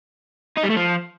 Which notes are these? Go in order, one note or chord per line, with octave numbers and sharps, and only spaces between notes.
D#4
G3
A3
F3